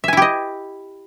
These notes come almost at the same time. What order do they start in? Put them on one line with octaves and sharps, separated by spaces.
E5 G#5 E4 G4 D#5